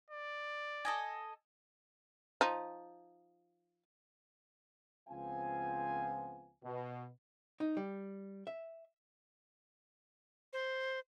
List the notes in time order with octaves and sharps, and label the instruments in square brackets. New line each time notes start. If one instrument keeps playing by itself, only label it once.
[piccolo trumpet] D5
[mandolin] A4 D#5 G#5
[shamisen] F3 D#4
[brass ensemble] C#2 F3 B3 C4 F5 G#5
B2
[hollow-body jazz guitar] D#4
G3
E5
[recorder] C5